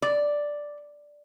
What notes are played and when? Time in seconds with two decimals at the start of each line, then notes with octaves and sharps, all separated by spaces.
0.02 D5